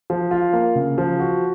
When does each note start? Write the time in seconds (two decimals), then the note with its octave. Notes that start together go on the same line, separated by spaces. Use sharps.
0.10 F3
0.31 F4
0.53 A#3
0.75 C#3
0.98 F3
1.19 F#4